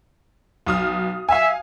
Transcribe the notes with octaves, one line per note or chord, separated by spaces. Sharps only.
B1 D#6 F6
E5 F5 G#5